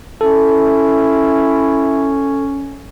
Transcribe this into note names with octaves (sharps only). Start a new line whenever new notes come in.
C#4 E4 A4